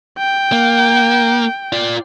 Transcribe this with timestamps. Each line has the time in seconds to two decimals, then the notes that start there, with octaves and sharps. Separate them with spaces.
0.18 G5
0.52 A#3
1.73 F4 D5